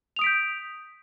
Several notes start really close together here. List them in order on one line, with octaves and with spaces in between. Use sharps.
F7 D#6 D7 B6 G6